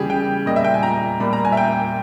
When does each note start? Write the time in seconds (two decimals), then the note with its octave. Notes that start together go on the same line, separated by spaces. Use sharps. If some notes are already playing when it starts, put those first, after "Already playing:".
Already playing: C#3 E3 G3 G4 G#4
0.10 G5
0.46 A#2 G3 D#5
0.56 E5
0.64 G5
0.74 G#5
0.83 A#5
1.20 A#2 G3 B5
1.33 A#5
1.45 G#5
1.52 E5
1.57 G5